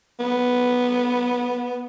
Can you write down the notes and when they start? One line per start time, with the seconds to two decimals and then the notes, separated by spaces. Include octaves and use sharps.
0.20 B3